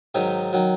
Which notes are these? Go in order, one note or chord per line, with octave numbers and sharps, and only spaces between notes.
G#2 D#3 F#3
D#3 F#3